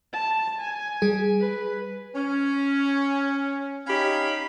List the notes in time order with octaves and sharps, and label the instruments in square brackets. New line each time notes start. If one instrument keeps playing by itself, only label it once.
[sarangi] A5
G#5
[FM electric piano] G3 G#4
[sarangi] B4
[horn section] C#4
C#4 D#4 G4 C#5 F5 B5